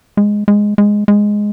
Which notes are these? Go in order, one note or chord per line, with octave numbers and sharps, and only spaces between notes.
G#3
G#3
G#3
G#3